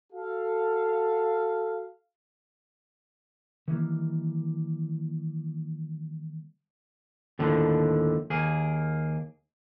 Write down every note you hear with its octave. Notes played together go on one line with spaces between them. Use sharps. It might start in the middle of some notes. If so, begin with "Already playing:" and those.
F#4 A4 F5
D#3 E3 G3 A#3
D#2 A2 D3 F3
D#2 A#3 G#4